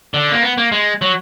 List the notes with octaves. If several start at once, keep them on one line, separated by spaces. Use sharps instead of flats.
D3
A#3
B3
A#3
G#3
F#3